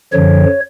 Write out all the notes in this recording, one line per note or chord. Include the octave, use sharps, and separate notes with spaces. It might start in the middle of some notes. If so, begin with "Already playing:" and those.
F#2 D3 F3 C#5